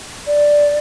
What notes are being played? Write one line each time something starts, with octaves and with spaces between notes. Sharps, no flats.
D5